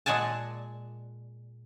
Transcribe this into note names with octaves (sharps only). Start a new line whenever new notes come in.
A#2 G#3 F#5 G#5 A5